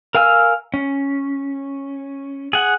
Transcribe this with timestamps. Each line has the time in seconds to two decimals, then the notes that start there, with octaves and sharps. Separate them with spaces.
0.15 A#4 F5 G#5 E6 F6
0.74 C#4
2.53 G#4 F#5